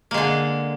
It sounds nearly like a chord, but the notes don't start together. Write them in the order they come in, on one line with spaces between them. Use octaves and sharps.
A#3 G#3 D3